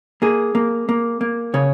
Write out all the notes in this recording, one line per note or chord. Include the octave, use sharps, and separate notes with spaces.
A#3 G#4
A#3
A#3
A#3
C#3 C#5